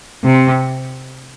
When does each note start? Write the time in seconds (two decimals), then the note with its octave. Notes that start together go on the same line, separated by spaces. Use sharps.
0.24 C3